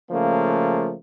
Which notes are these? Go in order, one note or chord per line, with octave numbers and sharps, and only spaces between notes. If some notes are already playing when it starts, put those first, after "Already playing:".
C#3 F3 A3 A#3